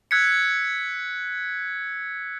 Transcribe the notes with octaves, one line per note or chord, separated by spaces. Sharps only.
E6 F#6 G#6 B6 C#7